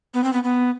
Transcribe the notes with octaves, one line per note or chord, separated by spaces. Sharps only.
B3
C4
B3
B3